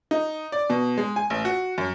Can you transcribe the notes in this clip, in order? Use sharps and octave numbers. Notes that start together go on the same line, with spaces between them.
D#4
D5
B2
G#3
G#5
A1
F#4
F#2